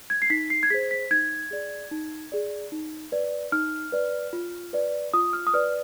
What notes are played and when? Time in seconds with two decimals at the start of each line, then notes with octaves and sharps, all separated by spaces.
0.10 G#6
0.22 C7
0.30 D#4 B6
0.50 C7
0.63 G#6
0.70 G#4 C5 B6
0.91 B6
1.11 D#4 G#6
1.51 G#4 D5
1.91 D#4
2.32 G#4 D5
2.72 D#4
3.12 B4 D5
3.52 D#4 F6
3.92 B4 D5
4.33 F4
4.73 B4 D5
5.13 F4 D#6
5.33 F6
5.47 D#6
5.54 B4 D5 F6